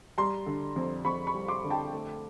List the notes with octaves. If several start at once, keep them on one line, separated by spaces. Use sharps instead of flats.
G3 A#5 C6
D3
F2
F2 B5 C#6
B5 C#6
G3
C6 D6
D3
G5 A5
A3